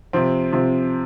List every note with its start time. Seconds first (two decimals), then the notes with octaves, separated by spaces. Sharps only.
0.13 C3 F3 C4
0.52 C3 F3 C4